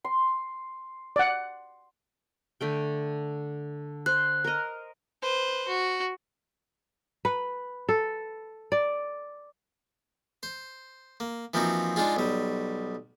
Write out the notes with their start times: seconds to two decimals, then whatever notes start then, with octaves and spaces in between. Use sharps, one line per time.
0.04 C6
1.16 D5 F#5
2.61 D3 A3 G5
4.06 C5 F#6
4.44 A#4 D#5
5.22 B4 C5
5.68 F#4
7.25 B4
7.89 A4
8.72 D5
10.43 C5
11.20 A#3
11.54 E3 F3 A#3 C4 D#4 F#4
11.96 G#3 D4 D#4 F4 G#4
12.16 B1 G3